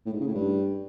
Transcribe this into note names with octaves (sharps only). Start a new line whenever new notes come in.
A2
G#2
C#3
A2
G2